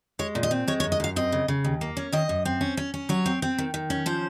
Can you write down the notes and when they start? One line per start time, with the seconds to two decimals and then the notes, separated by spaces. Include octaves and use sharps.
0.19 G#3 C#5
0.35 A#2
0.43 D#5
0.51 C4
0.68 G#3 C#5
0.80 C#5
0.84 F#2
0.92 D#5
1.00 F#2 F5
1.16 C4 D#5
1.32 C#3
1.48 C#3
1.64 D#2
1.81 A#3
1.97 C#4
2.12 D#3 D#5
2.29 F#2
2.45 C4
2.61 C#4
2.77 C#4
2.94 C#4
3.09 F#3 C#5
3.26 C4
3.42 C4
3.58 D#3
3.74 D#3
3.90 C#4
4.06 F3 C5